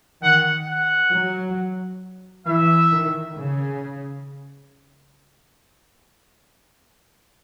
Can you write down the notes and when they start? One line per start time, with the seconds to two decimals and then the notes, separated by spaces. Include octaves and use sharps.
0.23 D#3 F#5
0.67 F#5
1.12 F#3
2.46 E3 E5
2.92 D#3
3.36 C#3